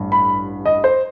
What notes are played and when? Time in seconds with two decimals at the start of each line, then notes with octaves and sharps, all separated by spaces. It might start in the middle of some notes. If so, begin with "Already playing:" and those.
Already playing: A1 G2
0.12 B5
0.66 D#5
0.84 C5